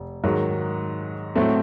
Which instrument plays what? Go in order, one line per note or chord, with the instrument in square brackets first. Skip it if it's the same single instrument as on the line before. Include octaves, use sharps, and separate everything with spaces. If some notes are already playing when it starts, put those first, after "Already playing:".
Already playing: [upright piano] F1
G#2 D#3 F#3
A2 F#3 A3 C4